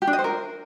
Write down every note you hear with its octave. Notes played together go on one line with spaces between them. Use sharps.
G4
D4
D#5
C5
A#4